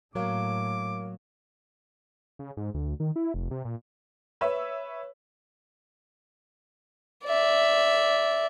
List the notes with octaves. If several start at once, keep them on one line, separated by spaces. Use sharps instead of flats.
A2 F#3 A#3 A#4 C#5 F5 D6
C#3
G#2
D2
D#3
E4
F1
C3
A#2
B4 C#5 E5 E6
D5 E5